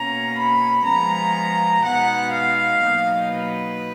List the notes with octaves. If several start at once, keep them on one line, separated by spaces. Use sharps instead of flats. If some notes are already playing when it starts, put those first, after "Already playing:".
Already playing: B2 A#3 C#4 A#5
B5
F3 G#3 B3 A#5
B2 G#3 B3 D#4 F#5
F5
B2 F#3 A#3 D#4
B4